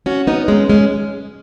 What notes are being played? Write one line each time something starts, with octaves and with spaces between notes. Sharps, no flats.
C#4 F#4
B3 D#4
G#3 C#4
G#3 C#4